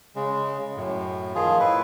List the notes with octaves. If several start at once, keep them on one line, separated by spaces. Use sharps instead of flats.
C#3 G#3
F#2 A2
D#3 F3 F4 G#4
A2 E4 B4